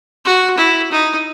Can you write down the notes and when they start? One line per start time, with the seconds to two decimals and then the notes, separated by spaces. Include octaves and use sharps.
0.25 F#4
0.57 E4
0.91 D#4